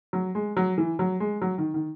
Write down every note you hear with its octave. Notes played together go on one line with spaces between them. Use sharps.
F#3
G#3
F#3
E3
F#3
G#3
F#3
D#3
D#3